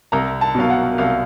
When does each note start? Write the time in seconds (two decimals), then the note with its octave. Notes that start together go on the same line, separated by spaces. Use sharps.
0.12 C2 A#5
0.41 A5
0.55 B2 F#3 F5
0.70 F#5
0.98 C2 F5